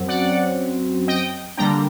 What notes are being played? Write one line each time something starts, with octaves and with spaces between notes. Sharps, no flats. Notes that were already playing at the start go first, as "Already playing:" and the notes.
Already playing: F#2 F#3 C4
D5 F#5
D#5 G5
D3 G3 A#3 D4 G5 A#5